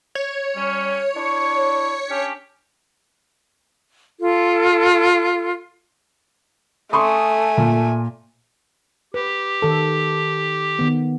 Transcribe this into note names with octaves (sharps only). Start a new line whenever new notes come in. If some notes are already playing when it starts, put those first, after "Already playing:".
C#5
G3 C#4
D4 E4 C#6
C#4 D4 G4
F4 A4
A3 G#5 C6 C#6 D#6
A#2
G4 B4
D#3 A4
D#3 B3